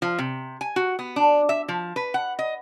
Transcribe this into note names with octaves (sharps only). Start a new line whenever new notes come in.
F3
C3
G#5
F#4
B3
D4
E5
F3
B4
F#5
D#5